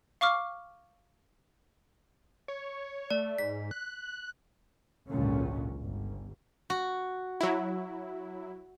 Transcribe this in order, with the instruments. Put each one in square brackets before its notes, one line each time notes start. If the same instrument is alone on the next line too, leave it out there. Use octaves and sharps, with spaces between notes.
[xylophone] F5 C#6 D6 F6
[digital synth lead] C#5
[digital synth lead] A3 [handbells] D5
[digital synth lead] G#2 [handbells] B6
[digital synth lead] F#6
[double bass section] G#1 C#2 A#2 D3 F#3 C#4
G1
[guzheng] F#4
[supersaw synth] F#3 E4